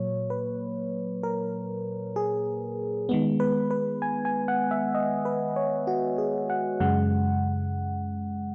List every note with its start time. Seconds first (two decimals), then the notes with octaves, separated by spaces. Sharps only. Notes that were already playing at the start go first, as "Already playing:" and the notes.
Already playing: A#2 F#3 A#3 C#5
0.30 B4
1.23 A#4
2.16 G#4
3.09 D#3 G#3 B3
3.40 B4
3.71 B4
4.02 G#5
4.25 G#5
4.48 F#5
4.71 E5
4.95 D#5
5.25 B4
5.56 C#5
5.87 F#4
6.18 G#4
6.50 F#5
6.80 F#2 C#3 G#3 F#5